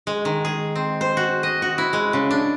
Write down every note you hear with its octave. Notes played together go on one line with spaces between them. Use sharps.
G#3
D#3
G#4
C4
C5
F#4
D#5
F#4
E4
G#3
C#3
D4